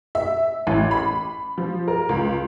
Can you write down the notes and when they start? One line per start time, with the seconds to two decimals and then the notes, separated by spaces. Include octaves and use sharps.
0.15 E5
0.67 A1
0.91 B5
1.58 F3
1.88 A#4
2.09 C#2